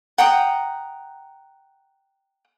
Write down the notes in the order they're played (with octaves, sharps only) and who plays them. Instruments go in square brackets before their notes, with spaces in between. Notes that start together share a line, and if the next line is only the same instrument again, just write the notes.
[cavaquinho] F#5 G5 A#5 D#6